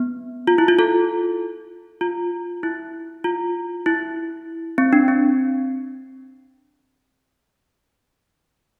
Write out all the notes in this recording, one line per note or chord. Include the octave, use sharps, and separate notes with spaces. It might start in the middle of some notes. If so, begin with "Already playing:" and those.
Already playing: B3
F4
E4
F4
F4 A4
F4
E4
F4
E4
C4
D4
C4